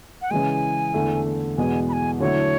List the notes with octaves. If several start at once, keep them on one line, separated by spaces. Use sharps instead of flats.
F#5
C#3 E3 G#3 G#5
E2 D3 A3 E4
E2 B2 G#3 G#5
B5
G#5
D3 F#3 A3 E4 C#5